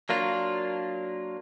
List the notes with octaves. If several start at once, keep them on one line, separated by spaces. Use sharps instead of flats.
F#3 A#3 D4 F4